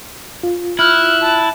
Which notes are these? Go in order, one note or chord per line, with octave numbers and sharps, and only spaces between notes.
F4
E4 F6 F#6
A5